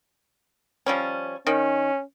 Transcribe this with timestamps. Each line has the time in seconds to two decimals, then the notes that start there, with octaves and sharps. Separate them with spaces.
0.86 F3 G3 C#4
1.47 D#3 C#4